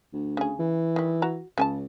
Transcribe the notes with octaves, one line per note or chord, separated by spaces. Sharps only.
D2
C#3 G#4
E3
D#3 G3
F#4 A#5
C#2 C#3 G#5 A5